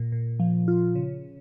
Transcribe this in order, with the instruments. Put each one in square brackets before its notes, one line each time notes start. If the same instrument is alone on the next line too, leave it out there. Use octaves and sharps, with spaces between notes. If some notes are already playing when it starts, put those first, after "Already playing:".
Already playing: [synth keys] A#2
A#2
F3
F4
C#3